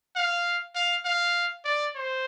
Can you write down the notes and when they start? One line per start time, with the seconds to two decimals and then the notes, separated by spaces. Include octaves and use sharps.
0.16 F5
0.75 F5
1.05 F5
1.65 D5
1.96 C5